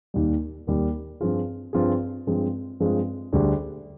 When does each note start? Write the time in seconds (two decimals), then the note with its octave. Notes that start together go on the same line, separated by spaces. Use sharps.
0.14 D#2 D#3 G3
0.67 D#2 D#3 G3
1.21 G2 F3 C4 F4 G#4
1.73 G2 F3 C4 F4 G#4
2.27 G2 F3 G#3 C4
2.80 G2 F3 G#3 C4
3.32 D2 D3 G3 D4 G#4